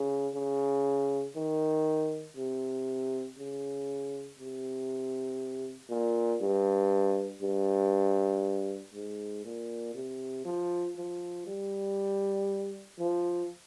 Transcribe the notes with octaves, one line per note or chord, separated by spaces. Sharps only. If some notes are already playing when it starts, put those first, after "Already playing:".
Already playing: C#3
C#3
D#3
C3
C#3
C3
A#2
G2
G2
G#2
A#2
C3
F3
F3
G3
F3